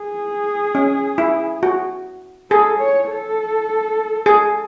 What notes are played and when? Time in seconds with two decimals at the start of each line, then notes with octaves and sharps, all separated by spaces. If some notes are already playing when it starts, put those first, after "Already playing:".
Already playing: G#4
0.75 C#4
1.18 E4
1.63 F#4
2.50 G#4 A4
2.79 C#5
3.09 A4
4.26 G#4